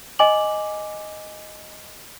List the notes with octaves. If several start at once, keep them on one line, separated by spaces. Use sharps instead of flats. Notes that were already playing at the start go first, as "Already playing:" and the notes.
D#5 G#5 D6 F#7